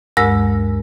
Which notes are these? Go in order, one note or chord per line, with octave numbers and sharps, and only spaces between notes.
D2 G2 G#3 A#4 E6 A#6